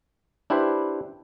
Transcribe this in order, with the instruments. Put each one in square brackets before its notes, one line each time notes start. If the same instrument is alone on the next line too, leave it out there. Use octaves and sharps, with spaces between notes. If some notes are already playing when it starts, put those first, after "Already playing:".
[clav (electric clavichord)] D4 E4 G4 B4 C5